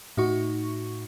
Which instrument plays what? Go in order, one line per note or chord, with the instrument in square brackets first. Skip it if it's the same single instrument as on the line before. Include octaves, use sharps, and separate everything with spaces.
[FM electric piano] A2 D#4 F#4 C#6